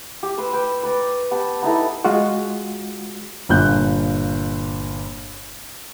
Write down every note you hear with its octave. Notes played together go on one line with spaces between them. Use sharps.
G4
B4 C6 E6
B4 G5
B4 D5 A#5 C#6
B3 G4 A5
B3 D#4 E4 A4
G#3 F4 F#4
G1 A#2 F#6 G6